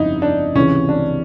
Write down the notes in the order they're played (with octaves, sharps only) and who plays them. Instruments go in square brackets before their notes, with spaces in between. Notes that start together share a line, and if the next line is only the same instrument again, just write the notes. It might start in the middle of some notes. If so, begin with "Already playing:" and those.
Already playing: [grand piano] G1 F2 C#3 [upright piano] D#4 E4
[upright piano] D4
[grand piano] C#2 C3 E3 G#3 [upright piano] C#4
[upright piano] D4